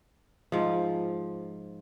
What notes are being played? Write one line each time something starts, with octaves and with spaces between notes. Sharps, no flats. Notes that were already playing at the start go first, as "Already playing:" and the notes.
G#2 F3